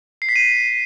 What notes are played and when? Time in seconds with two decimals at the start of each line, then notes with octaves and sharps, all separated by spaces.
0.22 C7
0.29 B6
0.36 D#7